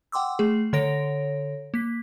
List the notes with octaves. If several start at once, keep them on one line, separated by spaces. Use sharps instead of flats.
F#5 G5 C6 D6 E6
A3 G#4
D3 A4 C#5 A#6 D7
A#3 B6